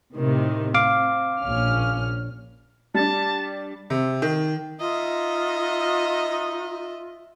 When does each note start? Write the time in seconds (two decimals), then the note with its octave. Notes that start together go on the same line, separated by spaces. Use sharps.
0.15 A2 C3 D#3
0.74 C4 F5 D6
1.40 A#1 C#4 F6
2.94 G3 D4 A5
3.90 C3
4.22 D#3
4.80 D#4 F4 D#5 E5